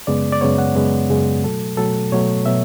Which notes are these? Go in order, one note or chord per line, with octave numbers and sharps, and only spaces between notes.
F#2 C#3 G#3 B3 D5
D5
F#2 C#3 G#3 B3 C#5
F#5
F#2 C#3 G#3 B3
F#2 C#3 G#3 B3 G#4
B2 F#3 A3 A4
B2 F#3 A3 A4
B2 F#3 A3 C#5
B2 F#3 E5